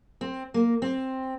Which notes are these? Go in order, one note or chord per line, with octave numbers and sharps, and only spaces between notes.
C4
A#3
C4